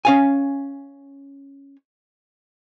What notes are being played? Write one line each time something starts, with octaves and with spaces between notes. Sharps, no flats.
C#4 F5 G#5